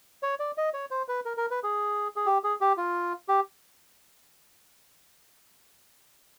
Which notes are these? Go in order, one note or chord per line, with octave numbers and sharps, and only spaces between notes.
C#5
D5
D#5
C#5
C5
B4
A#4
A#4
B4
G#4
G#4
G4
G#4
G4
F4
G4